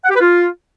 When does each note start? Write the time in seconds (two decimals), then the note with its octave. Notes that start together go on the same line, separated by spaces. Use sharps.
0.04 F#5
0.09 G4
0.15 B4
0.21 F4